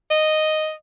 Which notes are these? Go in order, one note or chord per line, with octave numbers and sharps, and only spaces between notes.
D#5